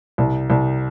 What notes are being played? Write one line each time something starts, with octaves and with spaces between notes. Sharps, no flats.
C2
C2